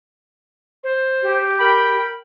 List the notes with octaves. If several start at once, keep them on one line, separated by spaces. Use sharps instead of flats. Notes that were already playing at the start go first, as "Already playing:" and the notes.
C5
G4
A#4 G5 B5